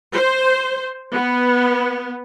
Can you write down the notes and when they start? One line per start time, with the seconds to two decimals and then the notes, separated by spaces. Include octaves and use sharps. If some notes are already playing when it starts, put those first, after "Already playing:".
0.15 C5
1.13 B3